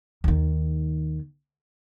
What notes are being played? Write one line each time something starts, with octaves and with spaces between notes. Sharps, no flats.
D#2 D#3